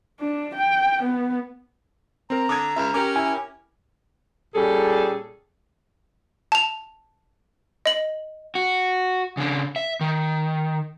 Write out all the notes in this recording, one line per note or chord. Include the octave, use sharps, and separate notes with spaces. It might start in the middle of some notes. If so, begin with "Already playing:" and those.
D4
G5
B3
C4 A#4 A#5
D3 D6 D#6 G#6
C#2 E5
C#4 G4 A#4 D6
E4 G#5
A#2 G3 C#4 G#4 A4
A5 F7
D#5 F#7
F#4
C#3 D4
E5
D#3